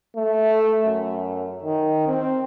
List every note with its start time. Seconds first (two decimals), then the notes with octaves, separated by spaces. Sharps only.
0.16 A3
0.86 F#2
1.63 D#3
2.07 C4